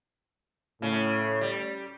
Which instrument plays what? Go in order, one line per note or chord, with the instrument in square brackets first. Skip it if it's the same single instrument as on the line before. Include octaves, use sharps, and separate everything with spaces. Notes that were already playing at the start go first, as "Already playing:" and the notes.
[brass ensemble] A2 [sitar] C#3
[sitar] G3